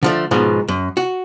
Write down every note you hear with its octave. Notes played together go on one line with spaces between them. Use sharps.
D3 F3 A3
G#2 B2 F3
F#2
F#4